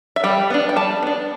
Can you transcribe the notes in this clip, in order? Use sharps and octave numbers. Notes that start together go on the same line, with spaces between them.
E5
G3 G5
B3 D4
G5
G3 A5
B3 D4